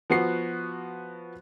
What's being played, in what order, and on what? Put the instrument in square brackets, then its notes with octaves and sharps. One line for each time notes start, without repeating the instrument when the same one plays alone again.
[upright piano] F3 B3 F#4 C7